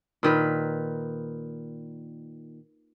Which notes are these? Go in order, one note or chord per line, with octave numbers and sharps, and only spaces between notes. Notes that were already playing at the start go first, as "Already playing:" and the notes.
A#2 D#3 B4